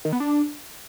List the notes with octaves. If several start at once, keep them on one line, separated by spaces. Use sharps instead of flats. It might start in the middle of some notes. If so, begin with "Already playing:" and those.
D#3
B3
D4